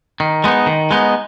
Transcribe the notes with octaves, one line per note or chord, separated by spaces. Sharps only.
D#3
G#3 B3 D#4
D#3
G#3 B3 D#4